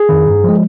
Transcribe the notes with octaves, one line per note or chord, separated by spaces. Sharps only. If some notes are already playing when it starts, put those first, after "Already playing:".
Already playing: G#4
F2 D#3
G2
F3 G#3